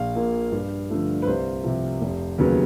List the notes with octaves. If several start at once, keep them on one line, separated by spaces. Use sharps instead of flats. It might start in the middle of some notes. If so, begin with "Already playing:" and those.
Already playing: A#1 F5
A#2 F3 A#3
G2
D3 F3 A3
B4
C2 C5
C3 F3
F1
D#2 C#3 F#3 B3